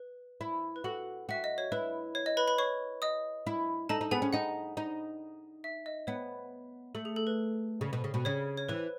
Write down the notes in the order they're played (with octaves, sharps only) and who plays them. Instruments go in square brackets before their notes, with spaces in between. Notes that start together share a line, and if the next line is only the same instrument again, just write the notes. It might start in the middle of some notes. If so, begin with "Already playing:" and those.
Already playing: [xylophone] B4
[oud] E4
[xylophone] B4
[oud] F#4 [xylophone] A4
[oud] F#4 [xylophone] E5
[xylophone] D#5
C#5
[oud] E4 [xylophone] B4
[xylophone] C#5
D#5
B4 B5
B4 B5
C#5 C#6
D#5 D#6
[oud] E4
[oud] D#4 [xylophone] A4 A5
[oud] D#4
[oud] B3 [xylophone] G#4 G#5
[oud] C#4
[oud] D#4 [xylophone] F#5
[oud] D#4
[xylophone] E5
D#5
[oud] B3 [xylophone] C#5
[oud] A3 [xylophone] A4
[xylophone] G#4
A4
B4
[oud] C#3
B2
C#3
B2
[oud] C#3 [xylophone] C#5
[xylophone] C#5
[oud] E3 [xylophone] B4